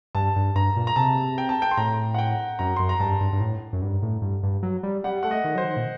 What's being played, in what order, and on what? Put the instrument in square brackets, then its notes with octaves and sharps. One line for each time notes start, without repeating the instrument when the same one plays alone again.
[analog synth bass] G2 [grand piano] A5
[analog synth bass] G2
[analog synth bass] G2 [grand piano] A#5
[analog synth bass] A#2
[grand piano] A#5
[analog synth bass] C3 [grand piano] A5
[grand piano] G5
A5
G5
C6
[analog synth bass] A2 [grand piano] A#5
[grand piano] F#5
G5
[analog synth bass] F#2 [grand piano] A#5
[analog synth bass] F#2 [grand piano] C6
[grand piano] A#5
[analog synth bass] G2 [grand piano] A5
[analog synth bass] G2
G2
A2
F#2
G2
A2
G2
G2
F#3
G3
[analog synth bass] G3 [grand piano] F#5
[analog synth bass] A3 [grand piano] F#5
[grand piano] D#5
[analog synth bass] D#3
[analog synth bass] F#3 [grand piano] C5
[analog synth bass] D#3
A#2